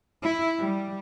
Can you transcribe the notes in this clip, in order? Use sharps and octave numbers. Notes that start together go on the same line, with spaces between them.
E4
G3